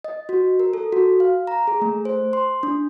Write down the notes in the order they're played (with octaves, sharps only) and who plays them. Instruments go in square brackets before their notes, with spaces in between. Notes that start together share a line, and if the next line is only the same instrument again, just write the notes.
[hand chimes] D#5
F#4
A#4
A4
F#4
F5
A#5
G#4
A3
C5
C6
D4